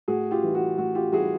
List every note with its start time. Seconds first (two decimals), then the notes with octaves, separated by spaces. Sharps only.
0.08 A2 F#4 G#4
0.31 F4 G4
0.43 E3 G3
0.54 F#4
0.78 A2 F#4
0.95 F4 G4
1.12 E3 G3 F#4 G#4